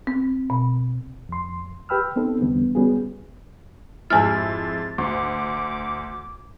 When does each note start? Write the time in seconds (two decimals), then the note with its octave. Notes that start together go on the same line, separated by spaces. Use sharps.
0.07 C4
0.50 B2
1.29 F2 C6
1.89 G4 B4 G5 B5 E6 F6
2.16 B3 C4 D#4 A4
2.41 E2 D3 G3 B3
2.75 G3 B3 C#4 F#4 G#4
4.10 F2 G#2 G#3 E4 G#5 F6 A6
4.98 D2 D6